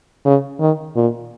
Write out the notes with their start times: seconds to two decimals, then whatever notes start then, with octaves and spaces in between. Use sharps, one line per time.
0.25 C#3
0.60 D#3
0.96 A#2